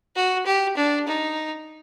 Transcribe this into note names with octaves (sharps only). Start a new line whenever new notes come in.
F#4
G4
D4
D#4